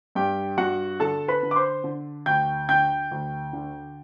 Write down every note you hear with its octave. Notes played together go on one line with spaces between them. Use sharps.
G2 G4 G5
G2 F#4 F#5
D3 A4 A5
B4 B5
D3
D6
C5 C6
D3
D2 G5 G6
D3 G5 G6
D2
D3